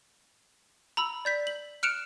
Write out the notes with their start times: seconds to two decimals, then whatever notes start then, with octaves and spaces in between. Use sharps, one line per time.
0.97 A#5 B5 E6
1.25 D5 G6 B6
1.47 F#7
1.83 F6 F#6 C#7 D7 E7 F7